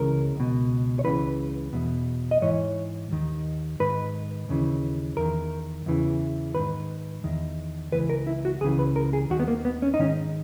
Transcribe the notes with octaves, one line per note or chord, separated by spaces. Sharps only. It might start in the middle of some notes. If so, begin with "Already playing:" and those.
Already playing: C#2 C#3 E3 A#4
C#2 B2
C#5
C#2 C#3 E3 B4
E2 B2
D#5
G#2 E3 C#5
D#2 D#3
G#2 D#3 B4
D#2 C#3 E3
E2 D#3 A#4
E2 C#3 E3
G#2 D#3 B4
E2 D#3
C#2 C#3 E3 B4
A#4
E4
F#4
C#2 C#3 E3 G#4
B4
A#4
G#4
D#2 D#3 F#4
B3
A#3
B3
C#4
D#4
G#2 D#3 C#4